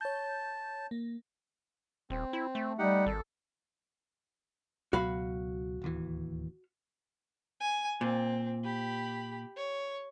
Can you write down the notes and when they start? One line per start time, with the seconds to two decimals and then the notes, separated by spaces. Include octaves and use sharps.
0.01 C#5 A5 G6
0.91 A#3
2.10 D#1 C4
2.33 E4
2.55 A3
2.79 G3 D#4 G4 F#5
3.06 G#1 A4
4.93 C#2 B2 F#3 F#4 F5 B5
5.82 D1 D#2 E3
7.60 G#5
8.01 A#2 C4
8.64 G4 B5
9.56 C#5